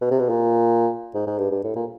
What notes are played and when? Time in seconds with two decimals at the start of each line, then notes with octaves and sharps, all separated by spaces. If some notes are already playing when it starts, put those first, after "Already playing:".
0.01 B2
0.11 C3
0.19 B2
0.29 A#2
1.14 G#2
1.27 G#2
1.39 G2
1.51 G2
1.64 A2
1.76 A#2